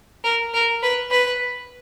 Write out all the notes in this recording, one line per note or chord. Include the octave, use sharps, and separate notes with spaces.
A#4
A#4
B4
B4